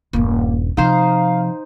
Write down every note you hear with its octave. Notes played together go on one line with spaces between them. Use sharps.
D#1 G2 A#3
C3 F3 D#4 C5 F5